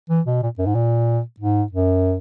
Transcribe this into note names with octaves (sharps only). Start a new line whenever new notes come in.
E3
B2
A#2
F#2
G#2
A#2
G#2
F#2